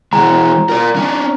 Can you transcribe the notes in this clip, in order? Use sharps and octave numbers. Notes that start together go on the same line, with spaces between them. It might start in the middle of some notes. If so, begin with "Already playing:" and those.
E3 G#3 A#5
A#4 D5
C#4 D4